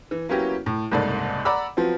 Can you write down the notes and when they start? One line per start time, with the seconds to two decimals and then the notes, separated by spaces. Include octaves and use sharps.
0.11 E3
0.29 F#3 A#3 B3 C#4 E4 G4
0.66 A2
0.92 F#1 C2 G#2 A4 D5
1.45 D5 F#5 A#5 B5 D6 E6
1.77 F3 F#3 B3 C4